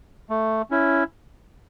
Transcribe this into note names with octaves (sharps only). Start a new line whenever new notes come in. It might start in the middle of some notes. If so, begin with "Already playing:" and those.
A3
C#4 E4